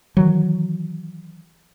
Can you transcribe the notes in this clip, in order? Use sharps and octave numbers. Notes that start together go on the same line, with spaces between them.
D#3 E3 F#3